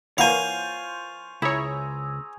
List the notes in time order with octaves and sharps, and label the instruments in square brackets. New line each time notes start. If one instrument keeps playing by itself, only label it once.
[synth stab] E3 A#3 [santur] F4 C5 C#5 [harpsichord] F5 G#5 [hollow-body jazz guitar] F#5
[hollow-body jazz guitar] C#2 [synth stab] E4 C#5 [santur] G#4 A#5 E6